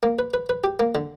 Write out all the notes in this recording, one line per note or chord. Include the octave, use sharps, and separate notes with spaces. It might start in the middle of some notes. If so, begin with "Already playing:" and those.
A#3
B4
B4
B4
G4
A#3
D3